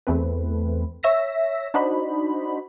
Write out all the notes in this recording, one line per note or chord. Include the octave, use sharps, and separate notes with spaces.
E2 A3 C4 B4
C#5 E5 E6 A#6 B6
D4 D#4 F#4 C5 D#5 B5